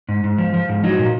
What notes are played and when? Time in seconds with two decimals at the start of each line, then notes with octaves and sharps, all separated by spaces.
0.09 G#2
0.24 G#2
0.38 F3
0.54 F3
0.69 G#2
0.84 F#3 D#4
0.99 A#2